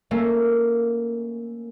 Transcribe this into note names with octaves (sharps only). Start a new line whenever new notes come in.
A3 A#3 C#4